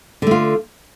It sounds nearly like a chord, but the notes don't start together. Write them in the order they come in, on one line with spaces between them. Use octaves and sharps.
D3 A3 F4